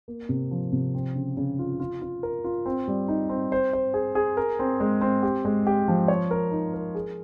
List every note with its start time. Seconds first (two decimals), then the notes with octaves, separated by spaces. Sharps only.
0.08 A#3
0.29 C3
0.51 F3
0.72 C3
0.95 C4
1.15 C#3
1.37 C#3
1.59 F4
1.80 F4
2.02 F4
2.23 A#4
2.44 F4
2.66 C4
2.88 G3
3.08 D#4
3.29 C4
3.52 C5
3.73 C5
3.94 G#4
4.15 G#4
4.37 A#4
4.59 C4
4.80 G#3
5.01 C4
5.23 G4
5.45 G#3
5.67 G4
5.88 F3
6.08 C#5
6.31 A#4
6.51 D#4
6.74 A#4
6.95 G#4